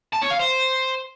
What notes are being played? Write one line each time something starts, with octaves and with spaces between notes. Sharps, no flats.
A5
C#5
F5
C5